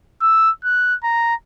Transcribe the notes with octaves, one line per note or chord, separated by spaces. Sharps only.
E6
F#6
A#5